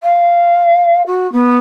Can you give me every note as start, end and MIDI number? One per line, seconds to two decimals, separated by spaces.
0.03 1.02 77
1.07 1.31 66
1.32 1.58 59